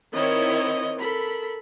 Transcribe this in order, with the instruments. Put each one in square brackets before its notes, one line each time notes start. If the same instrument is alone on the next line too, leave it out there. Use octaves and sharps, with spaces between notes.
[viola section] D#3 E4 C#5 [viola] C4 D#5
[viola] A4 A#4 [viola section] B5